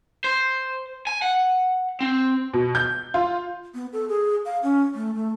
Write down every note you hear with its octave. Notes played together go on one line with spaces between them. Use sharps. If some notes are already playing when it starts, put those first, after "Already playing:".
C5
G#5
F#5
C4
B2
G6
F4
B3
A4
G#4
F5
C#4
A3
A3